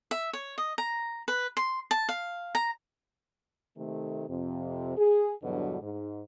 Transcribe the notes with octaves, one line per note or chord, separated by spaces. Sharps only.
E5
C#5
D#5
A#5
B4
C6
A5
F5
A#5
C3 D#3 A3
F2 C3
G#4
E2 G2 B2 D3 F#3
G#2